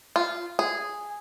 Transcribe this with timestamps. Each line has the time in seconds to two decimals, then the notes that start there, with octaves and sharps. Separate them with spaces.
0.16 F4
0.59 G#4